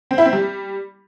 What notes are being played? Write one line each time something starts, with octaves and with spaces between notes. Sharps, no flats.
C4
E4
C4
G3